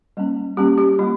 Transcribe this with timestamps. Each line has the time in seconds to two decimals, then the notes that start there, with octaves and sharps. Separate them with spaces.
0.17 G3 A#3 C#4
0.57 G3 A#3 C#4 G4
0.78 G4
0.99 G3 A#3 F4